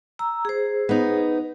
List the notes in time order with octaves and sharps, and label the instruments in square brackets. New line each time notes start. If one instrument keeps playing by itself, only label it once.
[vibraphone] A#5 E6
G#4 C5
[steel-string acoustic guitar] B3 D#4